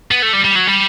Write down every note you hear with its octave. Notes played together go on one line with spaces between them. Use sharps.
B3
A3
G3
G3
F#3
G3